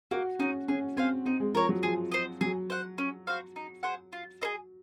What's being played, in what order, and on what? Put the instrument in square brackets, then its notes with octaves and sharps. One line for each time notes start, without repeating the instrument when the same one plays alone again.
[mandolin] A#3 [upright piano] F#4
[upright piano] C#4 [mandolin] D#4 F#4
[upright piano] C#4 [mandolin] G#4
[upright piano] C4 [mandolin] C5 F5 G#5
[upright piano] C4 [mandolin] D#4
[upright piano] G#3
[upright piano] F3 [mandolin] A#4 C#5
[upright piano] F#3
[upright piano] F3 [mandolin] G#4
[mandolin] C5 D#5
[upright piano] F#3 [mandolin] G#4
[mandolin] C5 F#5
C#4
F#4 C5 F5
D#4
G#4 C5 F#5
F4
G#4 C5 D#5